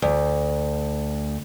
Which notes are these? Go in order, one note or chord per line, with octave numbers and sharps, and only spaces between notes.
D2